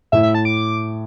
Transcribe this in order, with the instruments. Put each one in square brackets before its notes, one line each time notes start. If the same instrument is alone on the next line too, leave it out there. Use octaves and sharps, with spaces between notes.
[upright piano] A2 [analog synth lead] E5
[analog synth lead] E5
A5
D6